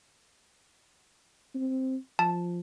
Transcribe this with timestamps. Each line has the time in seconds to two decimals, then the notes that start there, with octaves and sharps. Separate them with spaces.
1.54 C4
2.19 F3 A5